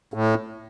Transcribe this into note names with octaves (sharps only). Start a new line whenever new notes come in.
A2